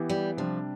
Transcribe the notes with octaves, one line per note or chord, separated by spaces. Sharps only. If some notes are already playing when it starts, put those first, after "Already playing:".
Already playing: E3 B3 E4 G4
G3
C3 F3 G3 D4